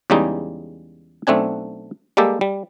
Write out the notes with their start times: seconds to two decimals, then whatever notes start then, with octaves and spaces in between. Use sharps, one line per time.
0.10 E2 C#3 G3 G#3 D#4
1.27 B1 A3 C4 D4 G#5
2.17 G3 G#3 A#3 G4 A4
2.41 G3